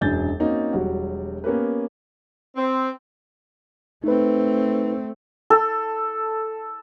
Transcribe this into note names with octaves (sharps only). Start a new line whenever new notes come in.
E1 F#2 D4 G#5 G6 A6
A#3 C4 C#4 D#4 F#4
E1 F#3 G3 F#4 F#5
A#3 B3 C#4 G4 A#4 B4
C4
A3 C4 D#4 B4
A4